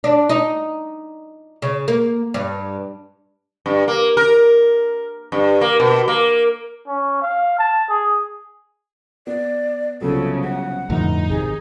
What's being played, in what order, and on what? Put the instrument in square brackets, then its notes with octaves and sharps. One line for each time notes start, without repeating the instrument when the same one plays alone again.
[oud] D4
D#4
C#3
A#3
G2
[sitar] G2
A#3
A#4
G2
A#3
B2
A#3
[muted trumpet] C#4
F5
A5
G#4
[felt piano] B3 [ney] D5
[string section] C2 C#3 [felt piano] F#3 B3 F4 [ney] A4
[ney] F#5
[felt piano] G1 [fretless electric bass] F2 A2 [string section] D#4
[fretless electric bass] G#1 D#3 [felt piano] C3 [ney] G#4